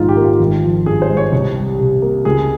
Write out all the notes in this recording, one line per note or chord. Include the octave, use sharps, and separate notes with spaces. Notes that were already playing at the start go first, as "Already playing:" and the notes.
Already playing: A#1 G#2 D#3 F4
G4
A#3
F4
G#1
F3
G2 G#4
C5
G#3
C#5
C2
G3
C3
A#3
C#2 G#4